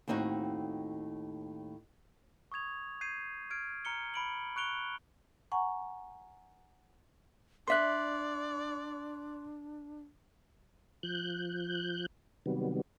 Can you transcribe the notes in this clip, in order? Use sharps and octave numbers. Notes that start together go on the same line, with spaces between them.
D#2 A2 C4 D#4 F#4
C#6 D#6 G#6 F7
G6 G#6 C7 D#7
F6 G#6 D7
A#5 F6 C#7 G7
B5 D7 F#7
C#6 F#6 C#7 D7 F7 G7
F#5 G#5 A#5 C#6
D4 B4 D5 E5 C6 F#6
F3 F#6 G6
C3 D#3 F#3 G3 B3